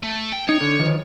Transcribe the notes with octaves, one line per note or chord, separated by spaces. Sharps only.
A3
G5
D#4 C#5
D3
D#3 F3 B4